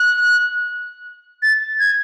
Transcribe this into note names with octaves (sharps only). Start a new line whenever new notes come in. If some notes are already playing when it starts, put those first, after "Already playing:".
Already playing: F#6
A6
G#6